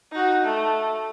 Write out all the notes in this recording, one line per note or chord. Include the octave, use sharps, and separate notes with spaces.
D#4 F#4
A3